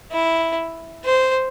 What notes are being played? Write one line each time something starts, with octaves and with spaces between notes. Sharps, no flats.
E4
C5